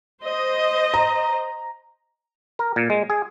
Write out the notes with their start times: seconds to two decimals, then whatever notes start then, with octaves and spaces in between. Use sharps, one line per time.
0.23 C5 D#5
0.94 A#5
2.59 A#4
2.76 A#2
2.90 G#3
3.10 G#4